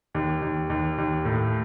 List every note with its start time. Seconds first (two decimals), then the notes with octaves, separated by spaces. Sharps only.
0.15 D#2
0.42 D#2
0.70 D#2
0.98 D#2
1.25 A2